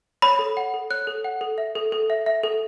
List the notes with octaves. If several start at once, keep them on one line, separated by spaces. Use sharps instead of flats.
C#5 B5
A4
F#5
A4
C#5 F#6
A4
F#5
A4
E5
A4
A4
E5
E5
A4